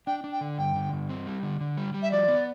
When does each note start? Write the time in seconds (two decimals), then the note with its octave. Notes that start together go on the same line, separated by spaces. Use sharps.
0.07 D4 G5
0.24 D4
0.32 G5
0.41 D3
0.58 G2 G5
0.75 D3
0.93 G2
1.09 C4
1.27 G3
1.43 D3
1.61 D3
1.78 G3
1.94 G3
2.02 E5
2.11 F3 D5
2.28 B3